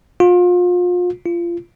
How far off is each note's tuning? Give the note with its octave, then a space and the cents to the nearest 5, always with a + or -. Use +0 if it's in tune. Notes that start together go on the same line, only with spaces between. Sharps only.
F4 +35
F4 -25